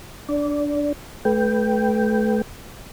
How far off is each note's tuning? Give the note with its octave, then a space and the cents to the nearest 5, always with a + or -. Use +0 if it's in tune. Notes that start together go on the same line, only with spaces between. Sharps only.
D4 -5 D5 -20
A3 -35 B4 +0 G5 +0